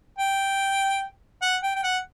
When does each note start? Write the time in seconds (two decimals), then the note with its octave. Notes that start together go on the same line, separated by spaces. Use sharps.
0.19 G5
1.42 F#5
1.63 G5
1.76 G5
1.83 F#5